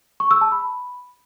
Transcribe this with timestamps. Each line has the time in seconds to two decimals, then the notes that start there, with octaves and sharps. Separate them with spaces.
0.20 C#6
0.31 E6
0.41 A5
0.52 B5